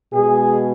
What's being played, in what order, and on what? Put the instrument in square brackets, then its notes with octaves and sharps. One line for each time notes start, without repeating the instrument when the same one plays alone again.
[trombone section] B2 G#3 G#4